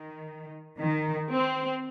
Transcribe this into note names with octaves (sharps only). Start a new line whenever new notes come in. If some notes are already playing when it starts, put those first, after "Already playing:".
Already playing: D#3
D#3
C4